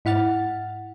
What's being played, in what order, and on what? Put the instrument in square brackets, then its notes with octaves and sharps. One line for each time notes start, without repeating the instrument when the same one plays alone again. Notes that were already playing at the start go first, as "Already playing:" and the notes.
[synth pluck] G#2 E4 F#5 F6 A6